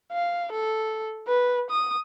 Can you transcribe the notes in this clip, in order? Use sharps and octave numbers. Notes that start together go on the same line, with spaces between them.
F5
A4
B4
D#6